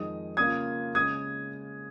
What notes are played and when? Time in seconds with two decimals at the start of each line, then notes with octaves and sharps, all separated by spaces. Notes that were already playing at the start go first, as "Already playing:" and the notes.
Already playing: F2 D#3 G#3 D#4 D#6
0.37 C#3 A#3 F4 D#6 G#6
0.95 C#3 G#3 D#6 G#6